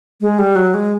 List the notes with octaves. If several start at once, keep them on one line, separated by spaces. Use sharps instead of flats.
G#3
G3
F#3
G#3